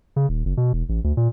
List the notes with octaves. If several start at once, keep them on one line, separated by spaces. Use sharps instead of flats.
C#3
D#1
F#1
B2
E1
A1
D2
A#2